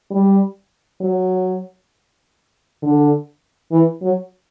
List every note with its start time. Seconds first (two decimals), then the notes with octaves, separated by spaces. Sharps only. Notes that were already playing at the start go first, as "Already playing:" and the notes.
0.11 G3
1.01 F#3
2.82 D3
3.72 E3
4.02 F#3